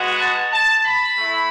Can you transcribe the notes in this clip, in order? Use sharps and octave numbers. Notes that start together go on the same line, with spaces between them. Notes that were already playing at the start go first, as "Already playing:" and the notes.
Already playing: G#3 B3 F#4
A5
A5
B5
A3 E4